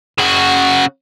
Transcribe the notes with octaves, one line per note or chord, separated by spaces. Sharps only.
C#3 F#4